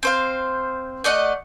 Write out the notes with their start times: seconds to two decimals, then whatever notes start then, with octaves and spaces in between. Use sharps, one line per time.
0.03 C4 C5 F5
1.04 A3 D5 D#5 F#5